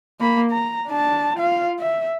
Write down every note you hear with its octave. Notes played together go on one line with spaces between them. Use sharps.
A#3 B5
A#5
D4 A5
F4 F5
E5